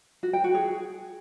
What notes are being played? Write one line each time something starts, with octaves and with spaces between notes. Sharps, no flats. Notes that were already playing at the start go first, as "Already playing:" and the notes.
F#4
G5
F#4
G#4